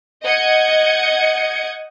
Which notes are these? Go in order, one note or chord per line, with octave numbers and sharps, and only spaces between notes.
D#5 F#5 D#6 G6 G#6 C#7